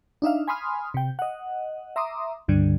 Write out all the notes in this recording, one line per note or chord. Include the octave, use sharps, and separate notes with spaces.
D4 D#4 E5 F5
G#5 B5 C6 D#6 F6
C3 G5
D#5 F#5
E5 A#5 C6 D6 D#6
C#2 G2 D3 G3